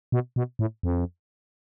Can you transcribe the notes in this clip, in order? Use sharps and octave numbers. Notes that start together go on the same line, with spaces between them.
B2
B2
A2
F2